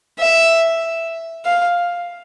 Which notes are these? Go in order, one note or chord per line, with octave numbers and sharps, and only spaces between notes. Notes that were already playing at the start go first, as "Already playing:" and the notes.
E5
F5